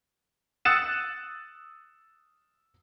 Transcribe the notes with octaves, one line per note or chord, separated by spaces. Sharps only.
D#6 E6 F#6 A6 C#7 E7